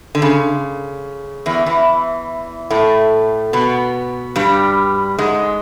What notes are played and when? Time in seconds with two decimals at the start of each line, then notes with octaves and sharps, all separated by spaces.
0.15 D3
0.22 C#3
1.46 E2 E3
1.66 E2 E3
2.70 A2 A3
3.53 B2 B3
4.36 G2 G3
5.18 G#2 G#3